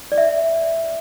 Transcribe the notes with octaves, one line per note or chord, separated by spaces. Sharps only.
D5
E5